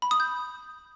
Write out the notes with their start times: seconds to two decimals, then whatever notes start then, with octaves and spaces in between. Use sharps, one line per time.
0.02 B5
0.11 D#6
0.20 G6